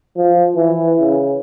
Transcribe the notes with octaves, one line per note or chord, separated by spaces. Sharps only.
F3
E3
C#3